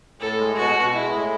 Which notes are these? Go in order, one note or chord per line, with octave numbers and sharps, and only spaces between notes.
A2 A4
G#3
B2 F#4
B2
G#3 E4
A2